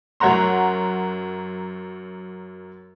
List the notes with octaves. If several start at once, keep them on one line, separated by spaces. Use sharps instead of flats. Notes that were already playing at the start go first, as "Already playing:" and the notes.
F#2 C#5 F#5 A#5 C6